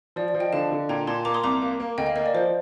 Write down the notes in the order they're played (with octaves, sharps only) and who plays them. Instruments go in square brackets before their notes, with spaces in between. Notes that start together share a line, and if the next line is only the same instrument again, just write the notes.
[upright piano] F3 [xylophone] D5
[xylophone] D5
[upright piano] F3
[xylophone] D#5 G5
[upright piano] D3 [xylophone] F5 A5
[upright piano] D3
[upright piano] A#2 [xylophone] G5 A#5
[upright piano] A#2 [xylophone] A5 C6
[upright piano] A#3 [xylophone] A#5 D6
[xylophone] C6 D#6
[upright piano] C2 [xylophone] A#5 D6
[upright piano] A#3
A#3
[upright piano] D2 [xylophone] D#5 G5
[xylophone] F5
[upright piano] A#3 [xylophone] D#5
[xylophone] D5
[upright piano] F3 [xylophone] C5